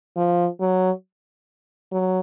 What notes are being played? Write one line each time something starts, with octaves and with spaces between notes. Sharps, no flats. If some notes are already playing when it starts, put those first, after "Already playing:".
F3
F#3
F#3